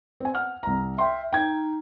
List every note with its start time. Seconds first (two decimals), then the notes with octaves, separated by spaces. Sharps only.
0.20 C4 G#5
0.34 F#5 F6
0.63 C2 A#5
0.98 E5 G5 C6
1.33 D#4 G5 G#6